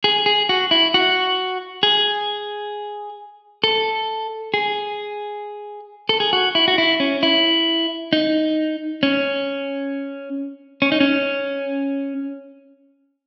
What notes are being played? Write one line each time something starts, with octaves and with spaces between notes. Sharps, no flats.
G#4
G#4
F#4
E4
F#4
G#4
A4
G#4
A4
G#4
F#4
E4
F#4
E4
C#4
E4
D#4
C#4
C#4
D#4
C#4